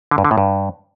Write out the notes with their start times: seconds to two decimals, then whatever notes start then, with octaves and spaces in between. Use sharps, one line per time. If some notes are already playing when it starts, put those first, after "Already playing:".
0.11 D3
0.18 G2
0.25 D3
0.31 A2
0.38 G2